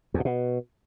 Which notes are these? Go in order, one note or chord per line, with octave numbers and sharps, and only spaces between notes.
E2
A#2
B2